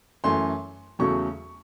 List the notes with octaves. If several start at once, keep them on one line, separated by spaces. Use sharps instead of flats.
F#2 E3 A3 C6
E2 C#3 F#3 A3 C#6